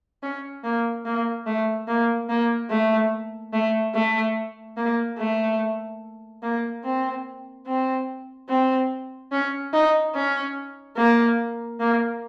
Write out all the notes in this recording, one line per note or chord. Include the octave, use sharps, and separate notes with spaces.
C#4
A#3
A#3
A3
A#3
A#3
A3
A3
A3
A#3
A3
A#3
C4
C4
C4
C#4
D#4
C#4
A#3
A#3